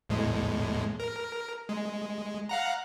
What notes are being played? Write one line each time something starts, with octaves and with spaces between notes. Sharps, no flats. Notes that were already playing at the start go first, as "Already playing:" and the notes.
E2 A2 G#3
A#4
G#3
F5 F#5 A#5